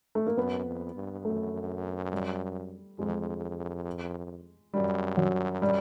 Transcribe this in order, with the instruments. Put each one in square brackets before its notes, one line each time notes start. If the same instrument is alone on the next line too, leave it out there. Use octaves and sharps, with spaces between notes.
[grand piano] A3
A#3
[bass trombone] F#2 [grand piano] B3
[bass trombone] F2
G2
[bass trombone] F#2 [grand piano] A3
[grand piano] G3
[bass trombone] F2 [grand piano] G#3
[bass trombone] F#2 [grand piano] G3
[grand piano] F#3
G3